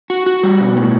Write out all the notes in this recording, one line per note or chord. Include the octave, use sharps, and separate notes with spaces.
F#4
F#4
G3
B2
A2